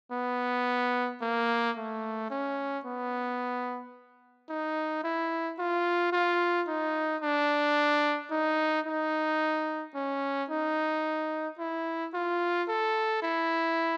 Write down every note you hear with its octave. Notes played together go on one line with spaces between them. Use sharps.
B3
A#3
A3
C#4
B3
D#4
E4
F4
F4
D#4
D4
D#4
D#4
C#4
D#4
E4
F4
A4
E4